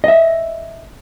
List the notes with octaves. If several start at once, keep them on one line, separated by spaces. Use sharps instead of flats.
D#5 E5